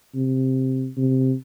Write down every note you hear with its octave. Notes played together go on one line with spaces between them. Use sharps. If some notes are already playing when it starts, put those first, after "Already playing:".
C3
C3